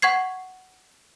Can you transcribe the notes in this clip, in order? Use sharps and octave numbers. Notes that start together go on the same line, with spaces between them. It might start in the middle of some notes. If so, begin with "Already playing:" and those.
F#5 C#6 G#6 C7